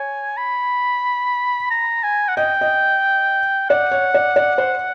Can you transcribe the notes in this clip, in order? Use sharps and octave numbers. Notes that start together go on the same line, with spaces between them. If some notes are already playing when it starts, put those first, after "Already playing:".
Already playing: C#5 G#5
B5
A#5
G#5
F#5
D#5 G5
D#5
D5 F#5
C#5
D5
D5
C5